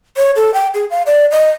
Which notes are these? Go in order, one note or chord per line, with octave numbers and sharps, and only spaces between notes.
C#5
A4
G5
G#4
F5
D5
D#5